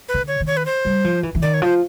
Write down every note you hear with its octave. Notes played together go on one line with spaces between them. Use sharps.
B4
D3
C#5
D#3
C#5
B4
C5
G3
F3
E3
E3
D#3 D5
C#5
F3 C5